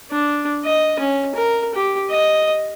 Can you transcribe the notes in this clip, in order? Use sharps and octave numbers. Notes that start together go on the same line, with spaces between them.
D4
D#5
C#4
A#4
G4
D#5